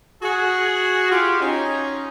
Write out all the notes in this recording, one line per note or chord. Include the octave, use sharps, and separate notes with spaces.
F#4 G#4
F4 G4
C#4 D#4